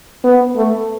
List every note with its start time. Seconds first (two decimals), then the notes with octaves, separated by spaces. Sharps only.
0.24 B3
0.57 A3